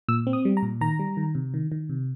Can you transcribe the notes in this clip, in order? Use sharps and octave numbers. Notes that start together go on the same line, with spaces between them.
A#2 E6
C4
D#6
G3
A#5
A#2
D#3 A#5
G3
D#3
C3
D#3
D#3
C3